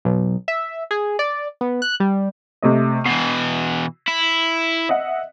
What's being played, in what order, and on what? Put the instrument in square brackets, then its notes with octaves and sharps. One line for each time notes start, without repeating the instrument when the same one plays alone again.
[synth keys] B1
E5
G#4
D5
B3
F#6
G3
[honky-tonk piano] C3 A3 D#5
[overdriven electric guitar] B2 E3 [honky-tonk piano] C7
[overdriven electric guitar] E4
[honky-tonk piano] D#5 E5 F#5